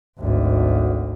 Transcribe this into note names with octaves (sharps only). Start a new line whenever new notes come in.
G#1 D2